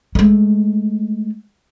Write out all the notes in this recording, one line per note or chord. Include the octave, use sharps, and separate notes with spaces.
G#3 A3